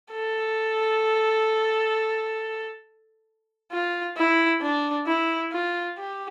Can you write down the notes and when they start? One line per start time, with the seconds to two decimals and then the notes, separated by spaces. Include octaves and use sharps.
0.13 A4
3.72 F4
4.17 E4
4.62 D4
5.07 E4
5.52 F4
5.97 G4